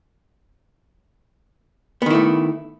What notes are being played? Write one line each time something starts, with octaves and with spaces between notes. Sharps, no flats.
D#3 A3 B3 E4